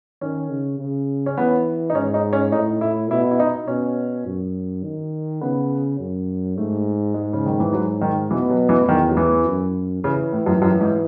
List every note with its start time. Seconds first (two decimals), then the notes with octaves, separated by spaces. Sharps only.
0.21 D#3 C#4
0.50 C#3
0.79 C#3
1.26 C#4
1.37 E3 B3
1.90 D#4
1.95 G#2 C#4
2.14 D#4
2.33 C#4
2.52 A2 D#4
2.81 A2 E4
3.11 B2 E4
3.31 E4
3.40 D#4
3.67 B2 C#4
4.26 F#2
4.84 D#3
5.41 C#3 B3
5.99 F#2
6.57 G#2 A3
7.14 G#3
7.33 C#3
7.46 D#3
7.60 E3
7.73 F#3
8.01 D#3
8.31 B2 E3
8.50 F#3
8.69 E3
8.87 E2 D#3
9.10 F#3
9.17 E3
9.46 F#2
10.04 C#3 E3
10.33 A2
10.46 F#2
10.62 F#2
10.81 G#2